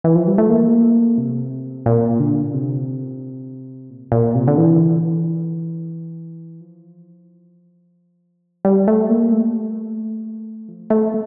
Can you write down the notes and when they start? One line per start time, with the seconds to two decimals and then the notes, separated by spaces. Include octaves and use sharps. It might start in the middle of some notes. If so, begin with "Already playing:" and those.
0.04 E3
0.15 F3
0.27 G3
0.38 A3
0.50 A#3
1.18 C3
1.86 A#2
2.20 D3
2.54 C3
3.90 A#2
4.12 A#2
4.35 C3
4.47 D3
4.57 E3
6.61 F3
8.65 G3
8.88 A3
9.09 A#3
9.32 A3
10.68 F3
10.90 A3